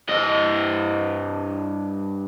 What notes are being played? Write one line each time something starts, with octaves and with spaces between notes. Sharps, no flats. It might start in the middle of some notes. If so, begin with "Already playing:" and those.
G2 D#5